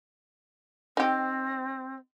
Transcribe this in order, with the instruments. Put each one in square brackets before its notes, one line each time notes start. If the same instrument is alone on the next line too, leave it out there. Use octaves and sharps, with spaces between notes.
[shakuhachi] C4 [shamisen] D#4 G4